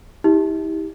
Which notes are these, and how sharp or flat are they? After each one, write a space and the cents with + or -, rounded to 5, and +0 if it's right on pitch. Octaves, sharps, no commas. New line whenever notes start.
E4 -40 G4 +10